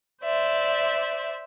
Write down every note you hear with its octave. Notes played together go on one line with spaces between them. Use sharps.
C5 D5 E5